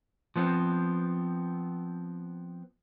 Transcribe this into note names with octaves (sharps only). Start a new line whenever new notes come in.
F3 B3 C4